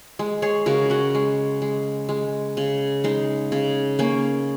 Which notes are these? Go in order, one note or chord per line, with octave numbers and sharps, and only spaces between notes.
G#3
G#4 C#5
C#3 F#4 A#4
C#4 F#4
G#3
G#3
G#3
C#3
G#3 D#4
C#3
A#3 C#4